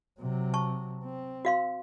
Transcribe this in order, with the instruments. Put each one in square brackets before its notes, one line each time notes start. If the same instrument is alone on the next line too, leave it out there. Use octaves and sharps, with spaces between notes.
[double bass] C3 F#3
[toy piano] A5 C#6
[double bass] C4
[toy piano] F#4 F5 C6